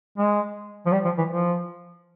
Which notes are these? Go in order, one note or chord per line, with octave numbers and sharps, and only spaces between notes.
G#3
F3
G3
F3
E3
F3